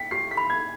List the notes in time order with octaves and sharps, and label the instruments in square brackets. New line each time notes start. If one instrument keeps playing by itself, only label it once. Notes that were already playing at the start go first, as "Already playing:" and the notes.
Already playing: [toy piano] G5 [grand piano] B6
[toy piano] G4 [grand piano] C7
[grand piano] B6
[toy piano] B5
[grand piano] G#6